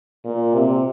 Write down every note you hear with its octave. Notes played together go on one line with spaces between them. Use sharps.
A#2
C3